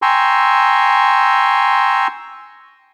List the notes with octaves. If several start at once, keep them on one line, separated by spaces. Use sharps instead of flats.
G5 G#5 A#5 C6 C#6 E6